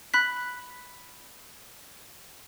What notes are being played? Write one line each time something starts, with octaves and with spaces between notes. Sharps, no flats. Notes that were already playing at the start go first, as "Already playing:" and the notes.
B5 F#6 B6